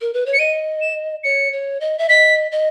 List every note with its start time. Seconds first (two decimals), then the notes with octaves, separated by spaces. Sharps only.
0.01 A#4
0.13 B4
0.26 C#5
0.33 C#7
0.39 D#5 D#7
0.81 E7
1.24 C#5 C#7
1.53 C#5
1.81 D#5
1.98 E5
2.09 D#5 B6
2.52 D#5